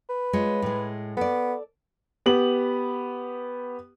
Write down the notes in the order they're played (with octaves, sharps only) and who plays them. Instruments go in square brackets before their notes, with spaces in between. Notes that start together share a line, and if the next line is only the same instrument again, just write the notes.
[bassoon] B4
[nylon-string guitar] G#3 F4 C#5
A2 G#3
[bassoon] B3 [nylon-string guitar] A4 D5
[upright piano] B3 G4 F#7